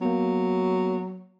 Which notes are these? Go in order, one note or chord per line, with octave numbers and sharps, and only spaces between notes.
F#3 A#3 B3